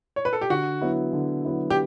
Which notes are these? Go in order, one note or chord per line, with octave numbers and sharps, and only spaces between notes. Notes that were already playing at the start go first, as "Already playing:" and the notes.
C#5
B4
A4
G4
D3 F#4
F#3 B3 E4
D3
F#3 B3 E4
G4